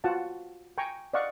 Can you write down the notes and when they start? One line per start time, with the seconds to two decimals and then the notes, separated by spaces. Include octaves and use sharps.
0.04 F4 F#4 F#5 A5
0.78 G5 G#5 A#5 C#6
1.13 D5 D#5 F5 F#5 C#6